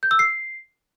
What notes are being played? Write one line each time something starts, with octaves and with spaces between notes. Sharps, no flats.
G6
E6
C7